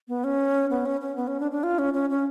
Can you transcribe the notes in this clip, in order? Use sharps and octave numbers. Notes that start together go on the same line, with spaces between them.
B3
C#4
B3
C#4
C#4
B3
C#4
D4
D4
F4
C#4
C#4
C#4